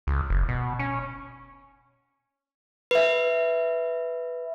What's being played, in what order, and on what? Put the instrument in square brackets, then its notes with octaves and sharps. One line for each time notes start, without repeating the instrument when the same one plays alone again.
[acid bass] C#2
F#1
B2
C#4
[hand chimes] B4 E5